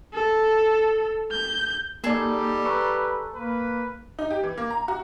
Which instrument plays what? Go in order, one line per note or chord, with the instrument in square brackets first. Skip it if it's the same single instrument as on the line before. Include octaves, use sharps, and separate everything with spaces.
[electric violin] A4
G6
[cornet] G3 [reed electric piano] A#3 D5 [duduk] D#4 [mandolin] G#4 A4
[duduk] B4 [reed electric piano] A#5 C#6 E6
[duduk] A#3 [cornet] B4
[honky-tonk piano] D#4
G4
E3
A#3
A#5
F#4